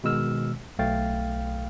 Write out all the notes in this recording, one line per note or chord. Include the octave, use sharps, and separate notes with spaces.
B2 D#3 G#3 E6 F6
B1 A3 F5 G5 A6